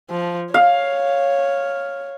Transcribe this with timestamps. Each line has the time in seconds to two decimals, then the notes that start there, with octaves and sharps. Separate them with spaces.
0.11 F3
0.54 C#5 F5